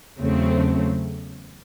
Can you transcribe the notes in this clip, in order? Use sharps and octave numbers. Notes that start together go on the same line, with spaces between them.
E2 C#3 F#3 A3 C4